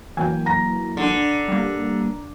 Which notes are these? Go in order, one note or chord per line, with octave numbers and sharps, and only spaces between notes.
E3 F#3 A#3 G5 G#5
A#5 A#6
D3
G3 A#3